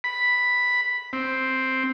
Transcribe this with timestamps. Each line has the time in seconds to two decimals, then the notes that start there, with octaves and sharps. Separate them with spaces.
0.04 B5
1.13 C4